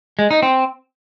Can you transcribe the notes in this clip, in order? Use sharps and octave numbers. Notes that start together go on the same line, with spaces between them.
G#3
D#4
C4